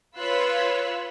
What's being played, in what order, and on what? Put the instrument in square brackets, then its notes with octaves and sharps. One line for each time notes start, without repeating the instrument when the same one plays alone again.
[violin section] F4 B4 C#5 B5 E6 F#6